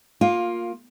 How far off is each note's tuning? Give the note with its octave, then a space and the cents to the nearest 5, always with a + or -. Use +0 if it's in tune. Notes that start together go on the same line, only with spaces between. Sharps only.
A#3 +0 F4 +15